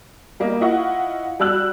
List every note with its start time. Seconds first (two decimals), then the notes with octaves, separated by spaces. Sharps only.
0.40 G3 A#3 D#5
0.61 E4 F4 D#5 F#5 C#6
1.40 G3 F#4 E6 F#6 F#7